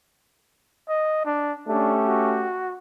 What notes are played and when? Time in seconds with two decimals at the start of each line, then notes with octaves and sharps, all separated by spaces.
0.89 D#5
1.25 D4
1.67 A3 C#4 D4 G4
2.07 F#4